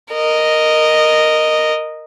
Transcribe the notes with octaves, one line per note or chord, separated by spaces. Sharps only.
A#4 D#5